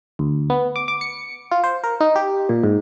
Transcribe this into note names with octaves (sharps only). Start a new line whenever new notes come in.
D2
B3
D6
D6
C#7
F4
C5
A#4
D#4
G4
A#2
G#2